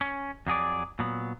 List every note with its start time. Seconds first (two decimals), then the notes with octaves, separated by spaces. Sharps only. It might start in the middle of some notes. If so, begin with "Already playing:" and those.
0.01 C#4
0.47 F2 F#3 G#4 D5
0.99 A#2 F#3 B3